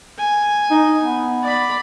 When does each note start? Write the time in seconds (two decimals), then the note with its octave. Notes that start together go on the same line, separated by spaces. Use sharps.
0.18 G#5
0.71 D#4
1.04 B3
1.43 D5 B5